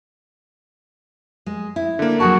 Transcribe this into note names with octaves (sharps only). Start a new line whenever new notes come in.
G#3
E4
D3 A#3
F#3 F#4 G#4 A5